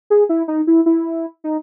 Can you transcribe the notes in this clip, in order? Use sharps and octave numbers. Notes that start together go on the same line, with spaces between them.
G#4
E4
D#4
E4
E4
D#4